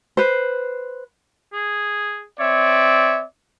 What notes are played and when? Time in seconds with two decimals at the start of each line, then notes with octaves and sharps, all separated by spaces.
0.17 B4 C5
1.53 G#4
2.39 C4 C#5 D5 E5